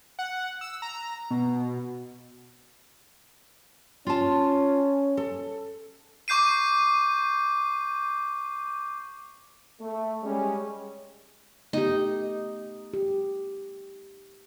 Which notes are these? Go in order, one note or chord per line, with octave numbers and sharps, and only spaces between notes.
F#5
E6
A#5
B2
C#4 F4 A5
A4
C#6 D6 G6 C7 D#7
A3
G3 G#3 C#4
A3 B3 D#4 G4
G4